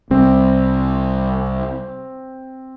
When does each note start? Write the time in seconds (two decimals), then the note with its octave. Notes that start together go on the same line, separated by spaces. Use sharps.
0.10 C2 C3 G3 C4